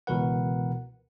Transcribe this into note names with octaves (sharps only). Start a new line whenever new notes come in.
C#2 B2 E3 A#4 B4 F#5